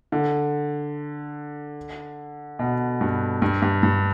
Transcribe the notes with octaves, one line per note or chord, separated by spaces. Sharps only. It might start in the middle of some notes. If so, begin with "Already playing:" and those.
D3
B2
G2
G2
G2
G2